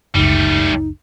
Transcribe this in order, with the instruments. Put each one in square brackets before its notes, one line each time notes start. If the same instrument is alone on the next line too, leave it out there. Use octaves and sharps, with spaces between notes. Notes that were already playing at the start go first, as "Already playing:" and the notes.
[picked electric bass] F#1 C#2 [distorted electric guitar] G3 A3 [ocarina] D#4